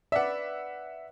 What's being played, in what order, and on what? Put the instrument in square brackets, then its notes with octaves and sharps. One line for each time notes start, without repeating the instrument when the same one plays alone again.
[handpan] B4 D5 [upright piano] E5 F#5